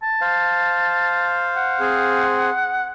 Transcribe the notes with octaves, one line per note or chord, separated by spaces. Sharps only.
A5
C5 F5
F#5
C4 G#4